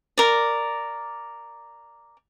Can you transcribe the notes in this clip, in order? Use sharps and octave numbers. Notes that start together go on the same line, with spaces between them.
A#4 D5